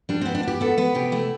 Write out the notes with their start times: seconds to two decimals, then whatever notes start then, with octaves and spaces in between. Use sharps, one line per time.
0.09 G3 D4
0.21 B3 C4
0.35 D4
0.43 B3 G4
0.61 B3 A4
0.78 B3 B4
0.95 C3 G4
1.12 A3 E4